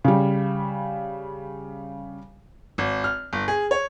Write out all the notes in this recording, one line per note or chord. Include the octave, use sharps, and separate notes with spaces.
C#3 G3
G#1
F6
G1
G#4
C#5